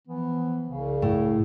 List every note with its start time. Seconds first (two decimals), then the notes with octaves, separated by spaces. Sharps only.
0.08 E3 F3 B3
0.69 C2 C#3
1.02 A2